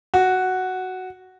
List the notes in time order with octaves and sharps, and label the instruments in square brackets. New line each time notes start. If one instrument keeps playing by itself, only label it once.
[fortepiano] F#4